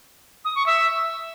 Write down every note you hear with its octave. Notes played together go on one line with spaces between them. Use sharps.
D#6
C#6
E5